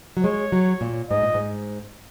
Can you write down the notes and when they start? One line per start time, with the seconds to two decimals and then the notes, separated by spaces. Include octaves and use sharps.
0.17 F#3
0.24 G#3 C#5
0.52 F#3
0.81 A#2
1.10 G#2 D#5
1.22 A#2
1.34 G#2